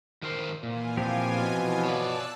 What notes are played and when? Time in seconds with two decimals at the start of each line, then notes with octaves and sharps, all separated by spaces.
0.23 D#3 A#4 C5
0.63 A#2 E3 F4 G#5
0.97 F3 C4 G4
1.37 B2
1.85 C#5 D5 A5 E6 F#6